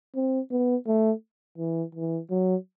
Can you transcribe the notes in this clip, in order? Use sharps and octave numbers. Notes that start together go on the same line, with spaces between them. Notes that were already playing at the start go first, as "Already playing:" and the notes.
C4
B3
A3
E3
E3
F#3